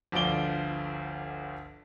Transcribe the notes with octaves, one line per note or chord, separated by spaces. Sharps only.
G1 D2 F3 D5 D7 G7